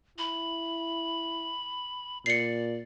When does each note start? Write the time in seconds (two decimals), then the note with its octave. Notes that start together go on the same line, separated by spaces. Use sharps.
0.18 E4 B5
2.26 A#2 D5 C7 C#7